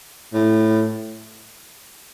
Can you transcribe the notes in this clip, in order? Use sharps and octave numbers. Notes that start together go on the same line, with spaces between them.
A2